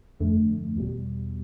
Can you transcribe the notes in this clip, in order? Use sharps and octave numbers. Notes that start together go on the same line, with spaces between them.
G1 F2 D3 A3
E2 B2 G3